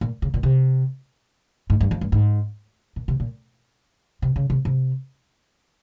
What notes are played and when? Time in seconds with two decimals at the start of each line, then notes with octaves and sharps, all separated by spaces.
0.01 A#2
0.22 C#3
0.34 A#2
0.43 C3
1.70 G#2
1.81 G2
1.91 F2
2.01 G2
2.12 G#2
2.96 A#2
3.08 C3
3.20 A#2
4.22 C3
4.36 C#3
4.50 C3
4.65 C3